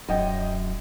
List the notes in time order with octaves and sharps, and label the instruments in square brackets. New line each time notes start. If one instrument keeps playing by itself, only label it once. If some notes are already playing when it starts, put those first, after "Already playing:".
[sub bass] D#1 [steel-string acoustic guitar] F#2 [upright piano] D#5 G5